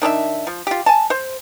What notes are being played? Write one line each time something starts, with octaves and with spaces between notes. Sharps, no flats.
D#3 D4 G4 E5
F3
F4 G4
G#5 A5
C5